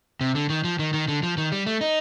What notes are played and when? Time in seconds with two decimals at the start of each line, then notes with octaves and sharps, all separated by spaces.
0.21 C3
0.35 D3
0.50 D#3
0.64 F3
0.79 D#3
0.94 D#3
1.08 D3
1.23 F3
1.38 D#3
1.52 G3
1.67 A3
1.81 D#4